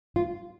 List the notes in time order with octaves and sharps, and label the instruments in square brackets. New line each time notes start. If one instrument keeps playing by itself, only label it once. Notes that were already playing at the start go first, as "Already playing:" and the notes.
[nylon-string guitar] F4